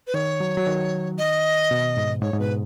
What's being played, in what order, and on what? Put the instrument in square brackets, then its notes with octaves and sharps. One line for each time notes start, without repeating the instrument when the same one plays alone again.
[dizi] B4
[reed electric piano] D#3 [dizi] C#5
[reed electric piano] F#3
F#3
D#3
[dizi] D#5
[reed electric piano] B2
G#2
[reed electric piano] G#2 [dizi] C#5
[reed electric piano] G#2
[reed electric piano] B2 [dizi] B4